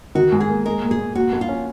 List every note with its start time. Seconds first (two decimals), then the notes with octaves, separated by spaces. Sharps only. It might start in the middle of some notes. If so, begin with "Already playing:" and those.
0.15 D#3 F#4
0.32 G#2
0.40 G#4
0.49 A#3
0.66 G#3 A#4
0.83 A#2
0.91 G#4
0.99 A#2
1.15 A#2 F#4
1.32 A#1
1.41 F4
1.49 C#4